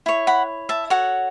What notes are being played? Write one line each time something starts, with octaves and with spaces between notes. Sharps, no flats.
E4 C#5
F#5 B5
E5 A5
F#4 A4 C#5 F#5